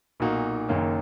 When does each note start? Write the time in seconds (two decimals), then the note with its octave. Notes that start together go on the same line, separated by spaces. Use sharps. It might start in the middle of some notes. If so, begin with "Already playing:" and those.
0.20 B1 A#2 A#3 D#4 F#4
0.69 F#1 F#2 D#3 A#3 C#4